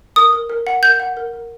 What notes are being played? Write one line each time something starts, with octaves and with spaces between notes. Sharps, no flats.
A#4 D#6
A#4
A#4
F#5
A#4 G6
F#5
A#4
A#4